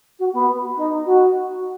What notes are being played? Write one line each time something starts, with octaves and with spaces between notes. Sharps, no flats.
F#4
B3
D#4
F#4